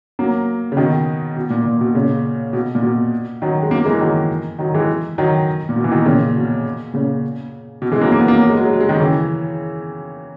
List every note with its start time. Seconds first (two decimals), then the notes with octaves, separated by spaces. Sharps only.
0.19 F#3 A#3
0.72 C#3
0.77 B2 D#3
1.36 B2
1.50 A#2
1.65 A#2
1.81 B2
1.95 A#2 C#3
2.53 B2
2.75 A#2
2.82 B2
3.42 D#3 F#3
3.62 G#3
3.71 F#3 A#3
3.81 A#3
3.85 E3 G#3
4.01 D#3 F#3
4.59 D#3 F#3
4.74 E3 G#3
5.18 D#3 F#3
5.69 A#2
5.76 B2
5.84 E3
5.91 B2 D#3
6.06 A#2 C#3
6.36 B2
6.94 A#2 C#3
7.82 B2
7.91 E3 G#3
8.01 F#3 A#3
8.12 A#3
8.20 B3
8.28 F#3 A#3
8.41 F#3
8.49 G#3
8.57 F#3
8.65 G#3
8.73 F#3
8.80 G#3
8.89 D#3 F#3
9.00 C#3 E3